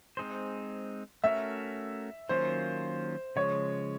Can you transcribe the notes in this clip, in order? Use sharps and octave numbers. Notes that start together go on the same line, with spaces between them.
G#3 C4 D#4 G#4 C5
A3 C#4 F#4 A#4 E5
D#3 F#3 A#3 C#4 F4 C5
C#3 F3 G#3 C#5